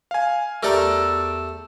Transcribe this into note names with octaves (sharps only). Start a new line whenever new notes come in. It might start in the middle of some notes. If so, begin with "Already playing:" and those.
F5 G#5
E2 A3 G4 A4 A#4 D5 A#5 E6